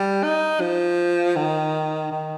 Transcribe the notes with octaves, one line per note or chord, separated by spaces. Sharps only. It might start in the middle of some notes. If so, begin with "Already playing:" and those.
Already playing: G3
D#4
F3
D#3
D#3